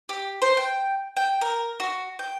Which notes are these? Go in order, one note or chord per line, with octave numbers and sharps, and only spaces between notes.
G4
C5
G5
G5
A#4
F#4
G5